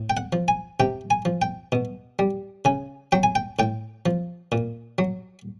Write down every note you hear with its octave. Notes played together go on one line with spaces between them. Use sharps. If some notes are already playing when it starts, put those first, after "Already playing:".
Already playing: A2
G5
F#5
F3
G#5
C3 G5
G#5
F3
G5
B2
G3
C#3 G#5
F#3 G5
G#5
G5
A2 G5
F3
A#2
F#3